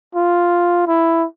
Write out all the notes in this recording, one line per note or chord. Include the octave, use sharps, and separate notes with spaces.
F4
E4